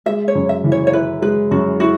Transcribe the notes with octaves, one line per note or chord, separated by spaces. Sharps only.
G#3 E5
C#5
F#2
E5
E3
C#5
C#5
E4 B4
G#3 B4
F#2 F#4
E4 F#4